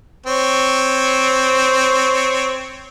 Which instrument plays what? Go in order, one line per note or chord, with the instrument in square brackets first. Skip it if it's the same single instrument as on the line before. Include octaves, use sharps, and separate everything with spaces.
[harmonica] C4 C#5